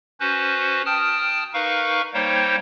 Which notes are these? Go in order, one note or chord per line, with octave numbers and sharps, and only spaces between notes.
C#4 F#4 B4 C5
G5 A5 D#6 F6
D#4 A#4 B4 F5 C#6
G3 A#3 D#4 C5 C#5 G5